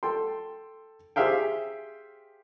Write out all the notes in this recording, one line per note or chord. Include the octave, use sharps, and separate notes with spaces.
A4 G5 C6
G4 G#4 C5 E5 F5 G5